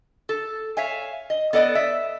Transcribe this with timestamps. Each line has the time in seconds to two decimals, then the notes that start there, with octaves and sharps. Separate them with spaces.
0.29 A4
0.77 C#5 E5 F5 G#5
1.30 D#5
1.53 B3 A4 D5 D#5
1.75 E5